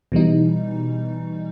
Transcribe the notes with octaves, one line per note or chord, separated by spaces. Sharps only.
B2 E3 G3 D#4